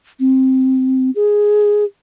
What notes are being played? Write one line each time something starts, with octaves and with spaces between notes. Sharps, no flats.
C4
G#4